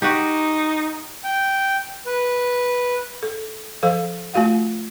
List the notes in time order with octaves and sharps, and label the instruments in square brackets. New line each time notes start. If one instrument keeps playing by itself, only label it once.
[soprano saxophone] D#4 [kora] F#4 G4
[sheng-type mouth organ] G5
B4
[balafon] A4
F3 A4 C5 F5
A3 F4 F#4 F5 F#5